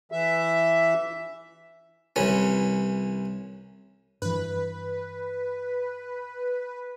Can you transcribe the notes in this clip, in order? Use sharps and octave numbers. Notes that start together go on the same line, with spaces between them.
E3 E5
C2 E3 C#4
G2 E3 B4